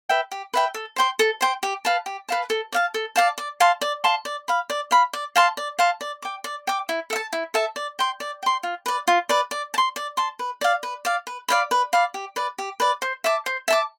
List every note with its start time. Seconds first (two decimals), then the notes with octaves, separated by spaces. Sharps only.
0.09 B4 E5 G5
0.31 G4
0.54 B4 E5 G5
0.74 A4
0.96 C5 G5 C6
1.19 A4
1.41 C5 G5 C6
1.63 G4
1.85 B4 F5 A5
2.06 G4
2.29 B4 F5 A5
2.50 A4
2.72 D5 F5 A5
2.94 A4
3.16 D5 F5 A5
3.38 D5
3.60 F5 A5 C6
3.81 D5
4.04 F5 A5 C6
4.25 D5
4.48 F5 B5
4.70 D5
4.91 F5 B5
5.13 D5
5.36 F5 A5 C6
5.57 D5
5.79 F5 A5 C6
6.01 D5
6.22 G5 D6
6.44 D5
6.67 G5 D6
6.89 E4
7.10 A4 E5
7.16 A5
7.33 E4
7.54 A4 E5 A5
7.76 D5
7.99 G5 C6
8.20 D5
8.43 G5 C6
8.63 F4
8.86 B4 D5
9.08 F4
9.29 B4 D5
9.51 D5
9.74 A5
9.78 C6
9.96 D5
10.17 A5 C6
10.39 B4
10.61 D5 F5
10.83 B4
11.05 D5 F5
11.27 B4
11.48 D5 F5 B5
11.71 B4
11.93 D5 F5 B5
12.14 G4
12.36 B4 D5
12.58 G4
12.80 B4 D5
13.02 C5
13.24 E5 A5 D6
13.46 C5
13.68 E5 A5 D6